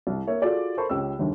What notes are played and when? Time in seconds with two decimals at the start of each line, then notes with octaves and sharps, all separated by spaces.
0.07 C2
0.27 A#3 C#5 E5
0.42 F4 F#4 G#4 A4 D5
0.77 A4 A#4 C5 A5 B5 C#6
0.89 C#2 G4 C#5 E6
1.19 G1 D#2